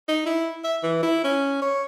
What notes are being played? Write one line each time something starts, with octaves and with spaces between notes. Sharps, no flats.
D#4
E4
E5
E3
E4
C#4
C#5